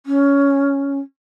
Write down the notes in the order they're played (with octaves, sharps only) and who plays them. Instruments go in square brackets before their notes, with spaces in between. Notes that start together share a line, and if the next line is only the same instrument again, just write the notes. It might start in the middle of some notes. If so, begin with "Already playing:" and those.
[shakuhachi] C#4